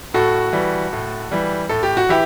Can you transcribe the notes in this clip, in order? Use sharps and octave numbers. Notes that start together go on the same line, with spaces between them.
A2 F#4 A4
E3 G3
A2
E3 G3
A2 A4
G4
F#4
E3 E4 G4